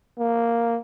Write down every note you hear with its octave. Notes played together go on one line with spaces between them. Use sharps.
A#3